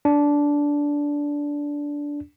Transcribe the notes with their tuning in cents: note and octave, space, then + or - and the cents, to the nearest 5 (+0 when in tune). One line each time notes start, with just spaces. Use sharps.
D4 -15